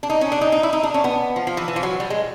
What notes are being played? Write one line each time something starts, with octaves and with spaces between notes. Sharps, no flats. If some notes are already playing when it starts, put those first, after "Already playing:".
D4
D#4
C#4
D4
D#4
D#4
E4
D#4
D4
C#4
B3
F3
F3
E3
E3
F3
F#3
G3
G#3